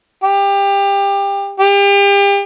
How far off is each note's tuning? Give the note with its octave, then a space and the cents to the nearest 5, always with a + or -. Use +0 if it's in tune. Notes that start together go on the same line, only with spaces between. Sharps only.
G4 +25
G4 +35